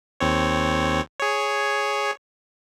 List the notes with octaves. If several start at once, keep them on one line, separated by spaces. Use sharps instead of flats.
D#2 C4 C#5
G#4 C#5